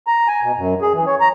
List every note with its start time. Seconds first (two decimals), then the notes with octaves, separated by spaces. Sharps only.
0.07 A#5
0.28 G#5
0.43 B2
0.57 F#2
0.81 G#4
0.94 E3
1.07 C#5
1.21 A#5